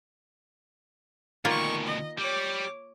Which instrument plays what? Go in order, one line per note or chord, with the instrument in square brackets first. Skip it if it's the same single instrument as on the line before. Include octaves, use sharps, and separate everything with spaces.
[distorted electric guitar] D2 B2 [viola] D#3 C#6 [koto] A#3 F4
[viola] D#5
[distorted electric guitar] G3 [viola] C#5 D6